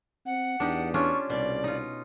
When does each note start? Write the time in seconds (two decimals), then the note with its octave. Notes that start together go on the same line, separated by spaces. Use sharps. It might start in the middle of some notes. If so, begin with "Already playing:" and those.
0.26 C4 F#5
0.60 E2 D4 D#4 G4
0.94 C#4 D4 F4 C#6
1.30 C2 B2 D5
1.64 D#4 F4